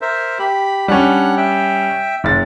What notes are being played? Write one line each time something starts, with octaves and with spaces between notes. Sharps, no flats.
A#4 C5 E5
G4 B5
G3 C#4 D4 F#5 F#6
E5 G5
F#1 A6